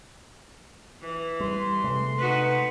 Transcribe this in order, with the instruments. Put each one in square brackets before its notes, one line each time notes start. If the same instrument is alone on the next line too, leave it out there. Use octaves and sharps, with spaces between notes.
[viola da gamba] E3
[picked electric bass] G3 [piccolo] C6
[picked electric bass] C3 G#3 A3
[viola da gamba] D#4 F#4 B4